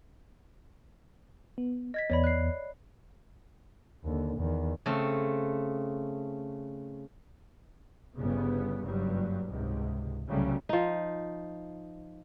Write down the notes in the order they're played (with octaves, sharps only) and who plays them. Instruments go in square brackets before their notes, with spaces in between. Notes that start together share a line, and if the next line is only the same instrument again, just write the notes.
[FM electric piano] B3
[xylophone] D#5 G#6 B6
[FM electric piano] E2 B3 [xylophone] C#5 D5 B5
[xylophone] F#6 C7
[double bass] D#2 D3
E2 D#3
[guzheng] C#3 A3 C4
[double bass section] G1 C#3 G3 B3
F#1 G2 F#3 G3
C#2 G#2 C3
C2 C#3 F#3 G3 A3 C#4
[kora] F3 D#4